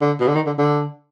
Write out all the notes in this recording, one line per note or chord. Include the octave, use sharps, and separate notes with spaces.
D3
B2
D3
D#3
D3
D3